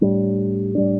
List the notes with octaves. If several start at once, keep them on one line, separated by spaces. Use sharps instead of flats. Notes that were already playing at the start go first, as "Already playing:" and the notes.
A2 G3 D4
A2 G3 D4